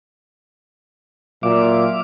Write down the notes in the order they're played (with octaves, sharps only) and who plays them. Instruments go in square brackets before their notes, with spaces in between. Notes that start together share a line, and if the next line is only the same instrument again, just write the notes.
[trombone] A#2 [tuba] F#3 [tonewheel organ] E5 F5 D6